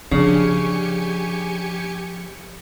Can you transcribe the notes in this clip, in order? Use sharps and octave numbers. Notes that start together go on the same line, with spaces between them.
C#3 F3 D4 G4 G#4 G#5 C#7